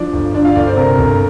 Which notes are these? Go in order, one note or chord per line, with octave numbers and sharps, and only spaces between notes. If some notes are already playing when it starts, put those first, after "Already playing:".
Already playing: F3 D4 D5
G1
D3 D4 D5
F4 F5
G1 D4 D5
C5
C3 A#4
G1